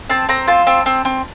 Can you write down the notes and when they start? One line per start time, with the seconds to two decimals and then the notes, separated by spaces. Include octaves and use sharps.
0.09 C4 A5
0.29 C4 A#5
0.47 F4 A5
0.67 C4
0.86 C4
1.05 C4